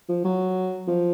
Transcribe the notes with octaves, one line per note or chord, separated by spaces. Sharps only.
F3
F#3
F3